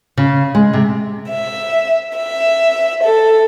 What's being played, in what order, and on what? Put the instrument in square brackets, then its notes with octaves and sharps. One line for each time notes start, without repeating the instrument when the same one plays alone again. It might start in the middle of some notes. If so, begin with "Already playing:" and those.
[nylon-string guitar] C#3
G#3
C3
[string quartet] E5
E5
A4